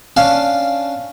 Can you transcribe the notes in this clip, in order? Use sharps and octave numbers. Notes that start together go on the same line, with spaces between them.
C#4 D4 F5 A5